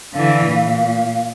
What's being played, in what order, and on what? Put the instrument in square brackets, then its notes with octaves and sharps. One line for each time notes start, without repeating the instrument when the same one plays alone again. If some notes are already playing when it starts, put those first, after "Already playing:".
[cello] D3 E3 [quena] F5
[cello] A#2